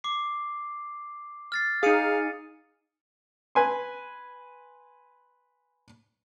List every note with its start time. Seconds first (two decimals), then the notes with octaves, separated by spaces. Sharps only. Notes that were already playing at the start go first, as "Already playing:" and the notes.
0.04 D6 C7
1.52 F6 A6 C7
1.83 D#4 G#4 F5 D#6 C#7 D#7
3.55 B4 G#5 C6